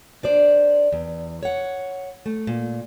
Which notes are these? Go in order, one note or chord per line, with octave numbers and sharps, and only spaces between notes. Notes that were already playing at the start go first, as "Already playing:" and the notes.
D4 C5 D5
E2
C#5 F#5
A3
A#2